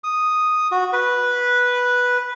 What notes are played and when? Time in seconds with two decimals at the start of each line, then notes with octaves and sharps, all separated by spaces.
0.04 D#6
0.72 F#4
0.93 B4